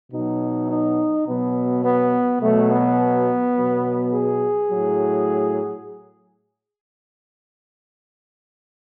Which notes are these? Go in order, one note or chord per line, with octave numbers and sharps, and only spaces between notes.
B2 F#3 D#4
D#4
B2 F#3 B3
B3
B2 F#3 A3
B3
B2 F#3
G#4
A2 F#3